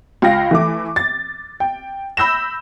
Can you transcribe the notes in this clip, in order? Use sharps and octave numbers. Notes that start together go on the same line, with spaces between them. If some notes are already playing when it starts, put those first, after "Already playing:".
C#2 F4 F5 G5 A#6
E3 A3 D6
A6
G5
B5 E6 G6 A#6 E7